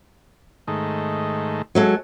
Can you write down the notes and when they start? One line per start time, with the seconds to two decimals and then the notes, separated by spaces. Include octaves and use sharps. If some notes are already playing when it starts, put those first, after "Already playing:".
0.68 G#2 D#3 A3
1.75 F#3 G#3 A4